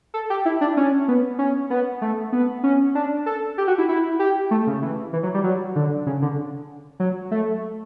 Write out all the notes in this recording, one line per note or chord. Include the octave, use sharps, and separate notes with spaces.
A4
G4
E4
D4
C#4
B3
C#4
B3
A3
B3
C#4
D4
A4
G4
F#4
E4
E4
G4
A3
C#3
E3
E3
F#3
G3
F#3
D3
C#3
D3
F#3
A3